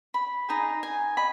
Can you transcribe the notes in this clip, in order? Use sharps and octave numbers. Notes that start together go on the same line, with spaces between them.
B5
D#4 G#4 D#5 A#5
G#5
D#5 B5